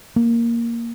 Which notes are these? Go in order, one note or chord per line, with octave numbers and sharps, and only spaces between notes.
A#3